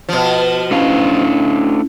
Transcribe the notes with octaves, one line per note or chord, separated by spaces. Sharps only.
B2 F3
A3 C#4 D4 E4 F5